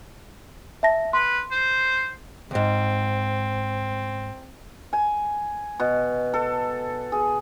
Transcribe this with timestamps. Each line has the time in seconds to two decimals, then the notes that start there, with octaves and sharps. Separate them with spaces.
0.83 E5 A5 A#6
1.13 B4 C6
1.51 C5
2.51 D2 G#2 C4
4.93 G#5
5.80 B2
6.34 A4
7.12 G#4